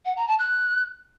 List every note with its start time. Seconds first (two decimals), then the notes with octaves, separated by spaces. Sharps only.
0.05 F#5
0.16 A#5
0.27 A5
0.39 F#6